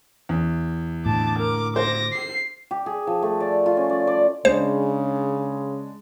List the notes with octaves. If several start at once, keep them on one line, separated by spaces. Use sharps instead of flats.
E2
A2 D3 A5 D6
A#4 D6
C5 D6 A#6
C7
G4
G#4
F3
A3
D5
F4
C#4
D5
D5
C#3 G#3 D4 C5